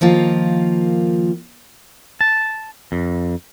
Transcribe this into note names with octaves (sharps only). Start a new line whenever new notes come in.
D#3 F3 A#3 F4
A5
F2